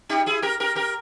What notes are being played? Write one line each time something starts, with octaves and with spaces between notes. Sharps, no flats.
D#4 G4
E4 G#4
G4 A#4
G4 A#4
G4 A#4